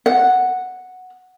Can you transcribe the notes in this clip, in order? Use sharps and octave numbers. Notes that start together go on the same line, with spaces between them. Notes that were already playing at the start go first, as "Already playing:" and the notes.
F#5